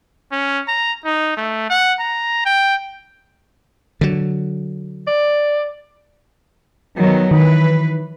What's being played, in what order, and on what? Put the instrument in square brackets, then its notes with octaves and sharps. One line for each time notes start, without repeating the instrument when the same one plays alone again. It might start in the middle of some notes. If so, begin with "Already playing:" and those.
[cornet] C#4
A#5
D#4
A3
F#5
A#5
G5
[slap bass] D3 F#3
[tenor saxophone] D5
[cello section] D#3 F#3 B3
[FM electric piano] D#3 [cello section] E3 B4